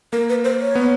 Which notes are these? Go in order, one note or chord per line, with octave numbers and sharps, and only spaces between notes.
A#3 A#4
B4
C5
C#5
B3